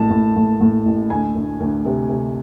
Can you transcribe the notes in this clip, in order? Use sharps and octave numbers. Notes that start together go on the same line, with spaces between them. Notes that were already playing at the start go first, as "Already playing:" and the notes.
Already playing: A1 A2 A5
A2
A2
A2
A1
D2 G#5
D2
D2
C3
C3